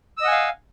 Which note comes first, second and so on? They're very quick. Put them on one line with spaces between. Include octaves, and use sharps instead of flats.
E6 D#5 F#5 G#5 F5